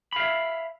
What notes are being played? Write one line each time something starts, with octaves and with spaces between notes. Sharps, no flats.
E5 F5 B5